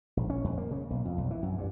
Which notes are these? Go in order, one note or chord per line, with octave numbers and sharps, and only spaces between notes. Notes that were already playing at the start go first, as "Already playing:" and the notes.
A#1
C#4
F2
A#3
C#3
B1
F2
B1
E3
F#2
G2